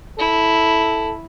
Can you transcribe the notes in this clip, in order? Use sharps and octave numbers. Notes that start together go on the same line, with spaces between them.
E4 A4